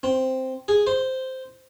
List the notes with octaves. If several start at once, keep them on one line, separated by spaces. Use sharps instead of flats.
C4
G#4
C5